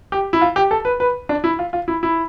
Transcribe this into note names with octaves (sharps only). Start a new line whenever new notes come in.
G4
E4
F4
G4
A4
B4
B4
D4
E4
F4
F4
E4
E4